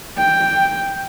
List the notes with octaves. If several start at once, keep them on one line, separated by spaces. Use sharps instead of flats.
G5